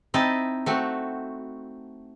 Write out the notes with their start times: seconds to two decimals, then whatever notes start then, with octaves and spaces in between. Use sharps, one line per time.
0.14 C4 D#4 E4 D#5 A5
0.66 A3 C4 F#4